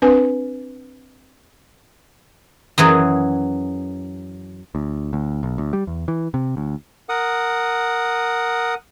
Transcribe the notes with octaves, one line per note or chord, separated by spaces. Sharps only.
C4 D4 B4 G#5
F#2 E3 F#3 G#4
D2
D2
B1
D2
G3
E2
E3
C3
D2
A#4 F#5 D#6